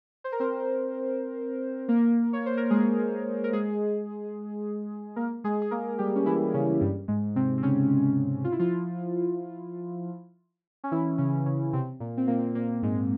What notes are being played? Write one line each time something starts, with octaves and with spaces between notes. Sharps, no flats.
C5
A#4
C4 C5
A#3 A#4
C#5
C5
A#4
G#3 G#4
A#4
G#3 G#4
A#3 A#4
G#3 G#4
G#4
A#3 A#4
G3 G4
C#4
E3 E4
C#3 C#4
G2 G3
G#2 G#3
C3 C4
C4
C#3 C#4
F4
E4
F3 F4
C#4
E3 E4
C#3 C#4
C#3 C#4
C3 C4
A#2 A#3
C4
A#2 A#3
A#2 A#3
G#2 G#3